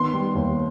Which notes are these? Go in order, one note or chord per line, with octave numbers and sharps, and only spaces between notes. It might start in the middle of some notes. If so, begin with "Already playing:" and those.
Already playing: D#3 B3 C6
G3
D#2